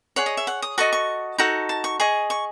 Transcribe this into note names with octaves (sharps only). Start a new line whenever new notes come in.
G#4 C#5 F#5
D#5
E5
F#5
D#6
F#4 A4 D#5 C#6
C#6
D#4 F#4 A4
A5
C#6
G#4 D#5 C#6
C#6